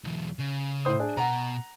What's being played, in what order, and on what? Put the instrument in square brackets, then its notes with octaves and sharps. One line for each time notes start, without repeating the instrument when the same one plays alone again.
[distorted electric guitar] B1 E2
C#3
[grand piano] A2 C5 D#6
D4 G#4
[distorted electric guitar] B2 [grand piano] F#5 A#5